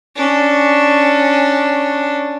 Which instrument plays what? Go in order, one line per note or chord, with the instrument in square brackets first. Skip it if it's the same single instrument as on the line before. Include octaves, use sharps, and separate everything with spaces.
[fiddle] C#4 D4